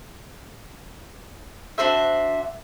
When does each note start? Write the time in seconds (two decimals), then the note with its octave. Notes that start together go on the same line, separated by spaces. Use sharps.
1.78 D4 F#4 C5 E5